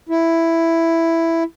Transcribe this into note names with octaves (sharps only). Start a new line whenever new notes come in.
E4